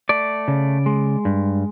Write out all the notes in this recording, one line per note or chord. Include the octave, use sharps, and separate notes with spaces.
A3 D5
C#3
G#3
G2